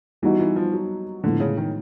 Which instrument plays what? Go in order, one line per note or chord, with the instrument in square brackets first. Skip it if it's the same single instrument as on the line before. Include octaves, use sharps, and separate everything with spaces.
[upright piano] E3 [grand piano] G3 B3 D#4 F#4
[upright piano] E3
F3
F#3
[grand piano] A2 F3 G#3 B3 E4 [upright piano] D3
[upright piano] C#3
D#3